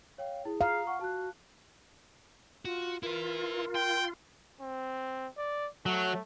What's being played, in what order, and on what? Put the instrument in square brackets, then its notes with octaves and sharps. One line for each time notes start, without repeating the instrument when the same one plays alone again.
[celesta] C#5 G5 [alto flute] F5
[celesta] E4 [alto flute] G#4
[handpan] F5 [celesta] A#5 D#6
[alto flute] F#5 [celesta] C#6
[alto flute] F#4 [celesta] A5 F#6
[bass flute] F4 [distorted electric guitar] F#4
[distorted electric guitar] E4 B4 [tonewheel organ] F4 [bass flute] A#4
[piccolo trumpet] G5 [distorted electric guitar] C6
[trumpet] C4
D5
[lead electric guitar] F#3 [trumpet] A3